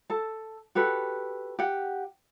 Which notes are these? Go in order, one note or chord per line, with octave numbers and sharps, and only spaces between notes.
A4 A5
F#4 G4 A4 B4
G4 F#5